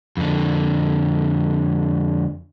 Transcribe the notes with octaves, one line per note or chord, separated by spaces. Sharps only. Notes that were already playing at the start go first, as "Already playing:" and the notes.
F2 D3